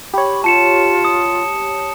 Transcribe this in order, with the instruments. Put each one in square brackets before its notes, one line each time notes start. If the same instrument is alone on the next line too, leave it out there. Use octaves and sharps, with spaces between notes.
[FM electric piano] G4 C#5 [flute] B5
[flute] F4 [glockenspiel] A5 C#7 E7
[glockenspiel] D#6